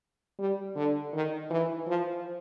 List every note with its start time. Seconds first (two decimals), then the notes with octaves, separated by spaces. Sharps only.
0.39 G3
0.75 D3
1.13 D#3
1.50 E3
1.87 F3